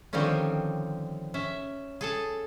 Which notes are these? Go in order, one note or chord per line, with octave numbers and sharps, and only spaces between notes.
D3 D#3 F3 G3 C4 C#4
C#4 E5
G#4 A4 A5